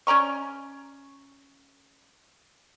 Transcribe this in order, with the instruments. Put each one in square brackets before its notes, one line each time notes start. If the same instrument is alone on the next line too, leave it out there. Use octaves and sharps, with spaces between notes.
[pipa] C#4 D5 A#5 C#6